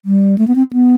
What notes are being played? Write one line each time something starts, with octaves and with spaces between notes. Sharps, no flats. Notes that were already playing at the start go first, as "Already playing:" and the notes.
G3
A3
B3
C4
B3